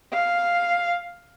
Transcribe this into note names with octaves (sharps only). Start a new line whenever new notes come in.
F5